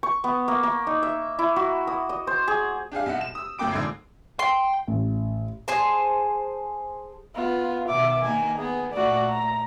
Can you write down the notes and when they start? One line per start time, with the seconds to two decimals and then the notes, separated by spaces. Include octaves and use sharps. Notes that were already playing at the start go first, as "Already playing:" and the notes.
0.03 C#6
0.24 B3
0.48 A#3
0.63 A#3
0.87 D#4
1.03 E5
1.39 E4
1.56 F#4
1.87 D#6
2.09 D#5
2.27 C5
2.48 G#4
2.92 D4 G4 G#4 F5
3.06 B1 E5 F#5
3.21 E7
3.35 D#6 E6
3.59 G1 F#2 A#3 G5 D6 D7
3.72 A#1 G#2 D3 G#6 C7
4.39 G5 C6
4.87 A1
5.68 G#4 C5 G#5 A5
7.36 B3 F4
7.89 B2 D#3 E5 D6
8.22 D#3 A#3 G#5
8.58 B3 G#4
8.93 A#2 A3 F#4 D5
9.29 A#5